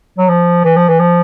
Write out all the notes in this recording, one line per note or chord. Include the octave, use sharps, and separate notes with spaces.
F#3
F3
E3
F3
E3
F3